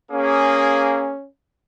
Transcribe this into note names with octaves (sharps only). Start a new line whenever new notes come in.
A#3 C#4 G#4